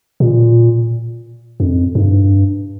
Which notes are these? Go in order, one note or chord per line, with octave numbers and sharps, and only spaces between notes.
A#2
F2
G2